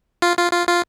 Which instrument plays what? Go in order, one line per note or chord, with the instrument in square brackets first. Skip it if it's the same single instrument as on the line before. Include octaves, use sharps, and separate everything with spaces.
[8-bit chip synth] F4
F4
F4
F4